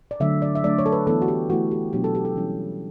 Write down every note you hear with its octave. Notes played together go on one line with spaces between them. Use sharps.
D5
D3 F#3 A3 D4 E5
D5
E5
F#3 A3 D4 D5
C#5
A4
B4
E3 B3 E4 A4
F#4
G4
E3 A3 E4 F#4
G4
B2 F#3 B3 D4 G4
A4
G4
A4
E3 G3 C#4 E4